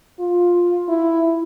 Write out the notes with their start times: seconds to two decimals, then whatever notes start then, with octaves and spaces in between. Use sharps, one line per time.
0.19 F4
0.88 E4